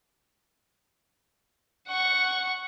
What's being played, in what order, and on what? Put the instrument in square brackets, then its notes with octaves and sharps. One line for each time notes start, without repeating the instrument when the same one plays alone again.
[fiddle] F#5 C#6